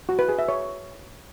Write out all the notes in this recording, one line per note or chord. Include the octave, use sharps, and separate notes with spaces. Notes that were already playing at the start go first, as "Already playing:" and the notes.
F#4
B4
G#4
E5
C#5